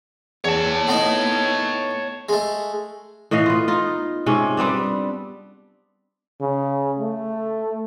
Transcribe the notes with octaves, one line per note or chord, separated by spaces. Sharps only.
E2 C#5 A5
A2 B3 D#4
G#3 A3
A2 E3 D#5 F5
B3 F4
D#4 F4
G#2 C3 C#4
G3 B3 C4 D4
C#3
A3